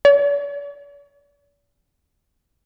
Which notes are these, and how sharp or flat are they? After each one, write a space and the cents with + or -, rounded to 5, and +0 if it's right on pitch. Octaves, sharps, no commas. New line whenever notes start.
D5 -45